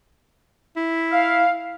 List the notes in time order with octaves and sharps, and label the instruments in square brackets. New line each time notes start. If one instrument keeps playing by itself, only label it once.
[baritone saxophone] E4
[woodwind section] F5